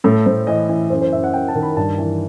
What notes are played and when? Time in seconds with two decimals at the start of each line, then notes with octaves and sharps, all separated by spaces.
0.04 A2 A4
0.26 A2 C5
0.47 E3 D#5
0.69 E3
0.90 F#2 C5
1.01 C5
1.12 F#2 E5
1.24 F#5
1.34 F#2 G5
1.48 A5
1.55 D#3
1.63 B5
1.77 G2 A5
1.98 E3